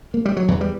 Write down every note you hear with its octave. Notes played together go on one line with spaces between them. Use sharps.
A#3
G3
F#3
E2 E3
G3